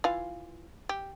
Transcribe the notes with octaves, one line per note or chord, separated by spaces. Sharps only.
E3 F4 F5
G4